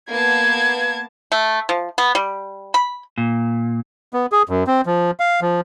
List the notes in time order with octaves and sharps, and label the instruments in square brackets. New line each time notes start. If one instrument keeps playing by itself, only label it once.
[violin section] A#3 B3 A5 [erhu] G#6
[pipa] A3
F3
B3
G3
B5
[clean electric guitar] A#2
[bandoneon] B3
G#4
F#2
C4
F3
F5
F3